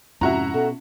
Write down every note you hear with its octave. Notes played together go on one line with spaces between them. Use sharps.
F2 G#2 C3 C#4 E4 F#4 A#5
B2 A4